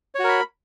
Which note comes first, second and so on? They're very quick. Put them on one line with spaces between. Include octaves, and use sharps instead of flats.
C#5 F#4 A#4 B5